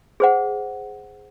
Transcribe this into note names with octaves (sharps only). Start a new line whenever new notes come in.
G#4 C5 F#5